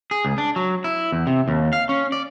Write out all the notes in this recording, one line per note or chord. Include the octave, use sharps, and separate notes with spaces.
G#4
C#2
D4
F#3
E4
E2
C3
D#2
F5
C#4
D5